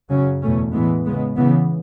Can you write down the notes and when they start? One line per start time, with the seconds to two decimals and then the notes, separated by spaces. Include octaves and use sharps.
0.09 F#2 C#3 F#3 C#4
0.41 E2 B2 A3 C#4
0.73 A2 E3 G#3 B3
1.05 C#3 G#3 B3
1.36 C#3 E3 B3